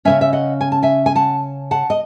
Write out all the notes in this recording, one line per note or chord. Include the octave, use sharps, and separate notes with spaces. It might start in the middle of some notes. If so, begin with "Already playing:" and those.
C#3 G#3 C#4 E5 G#5
E5
D#5 F#5
G#5
A5
E5 G#5
G#5
F#5 A5
F#5 A5
D#5